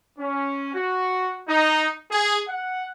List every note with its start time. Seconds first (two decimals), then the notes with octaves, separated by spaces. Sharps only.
0.19 C#4
0.74 F#4
1.48 D#4
2.10 G#4
2.49 F#5